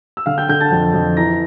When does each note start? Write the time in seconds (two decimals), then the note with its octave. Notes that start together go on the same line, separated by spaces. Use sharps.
0.17 E6
0.26 D3 F5 F6
0.38 G5 G6
0.48 D3 G5 G6
0.60 A5 A6
0.72 F2
0.94 F2
1.17 E3 A#5 A#6